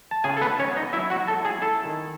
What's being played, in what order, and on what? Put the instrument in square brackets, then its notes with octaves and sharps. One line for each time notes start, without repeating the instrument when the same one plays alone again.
[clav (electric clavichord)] A5
C#3 G#4 G#5
A4
B3 B4
D#4
C#4 C#5
B3
D#4 D#5
F#3 E4 E5
F#4 F#5
F#3
A4 A5
E4
G#4 G#5
E4 A4 A5
D#3